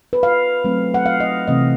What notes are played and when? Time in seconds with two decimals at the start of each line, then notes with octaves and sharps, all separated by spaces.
0.13 B4
0.23 F5
0.64 F#3 A3 C4
0.94 F#5
1.06 F5
1.20 D#5
1.47 C3 E3 A3 C4 D#5